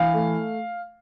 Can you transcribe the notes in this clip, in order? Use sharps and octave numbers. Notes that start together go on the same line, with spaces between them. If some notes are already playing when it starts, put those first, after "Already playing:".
Already playing: E3 F5
A3